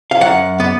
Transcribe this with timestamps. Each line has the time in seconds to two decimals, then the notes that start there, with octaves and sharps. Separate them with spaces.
0.11 F5
0.21 F#2 F#5
0.60 B3